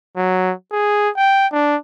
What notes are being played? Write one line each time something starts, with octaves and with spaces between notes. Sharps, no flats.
F#3
G#4
G5
D4